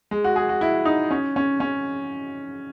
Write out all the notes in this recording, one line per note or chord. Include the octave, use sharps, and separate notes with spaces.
G#3
F#4
G#4
F#4
E4
D#4
C#4
C#4
C#4